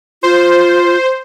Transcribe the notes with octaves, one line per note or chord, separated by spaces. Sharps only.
F4 C5